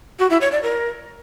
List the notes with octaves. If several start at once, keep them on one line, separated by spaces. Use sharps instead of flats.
F#4
E4
C#5
D5
A#4